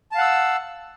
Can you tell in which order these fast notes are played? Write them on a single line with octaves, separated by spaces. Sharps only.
A5 F5 F#5 E6